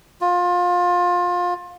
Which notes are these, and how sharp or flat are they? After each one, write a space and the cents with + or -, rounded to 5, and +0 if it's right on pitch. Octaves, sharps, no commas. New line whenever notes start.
F4 +25